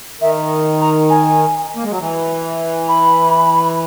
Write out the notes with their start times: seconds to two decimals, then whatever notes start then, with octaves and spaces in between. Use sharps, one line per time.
0.21 D#3 E5
0.81 A#5
1.10 G#5
1.76 A#3
1.84 G#3
1.91 F#3
2.00 E3
2.88 B5